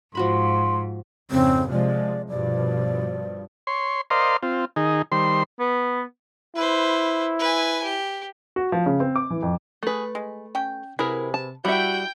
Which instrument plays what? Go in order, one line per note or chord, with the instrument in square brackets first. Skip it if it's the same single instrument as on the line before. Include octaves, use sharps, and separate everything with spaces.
[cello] G#2 [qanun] F3 F#4 B5 [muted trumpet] C6
[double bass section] F2 G#2 C#3 [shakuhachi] C4
[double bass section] C3 F3 G#3 [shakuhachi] D5
[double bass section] G2 B2 F3 [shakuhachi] D5
[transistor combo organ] C#5 C6
A#4 C5 D5 D#5 F5 C6
C4 F4
D#3 D#4 G#4
D#3 G3 C5 C6
[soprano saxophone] B3
[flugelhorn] E4 [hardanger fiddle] B4 C5
[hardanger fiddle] B4 G#5
G4
[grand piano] F#4
F3
C#3
C4
D6
E3
F2
[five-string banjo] A3 B4 [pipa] F#4 G#4
[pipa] G#3
C#4 G5
[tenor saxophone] C3 [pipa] F#3 G#4 B4 [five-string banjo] E4 A#4
[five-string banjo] A5
[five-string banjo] G3 E5 [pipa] E4 [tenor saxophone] F#4 [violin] G5 G6